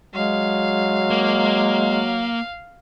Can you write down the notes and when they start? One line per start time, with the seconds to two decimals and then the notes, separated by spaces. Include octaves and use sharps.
0.15 F#3 G#3 F5
1.11 A#3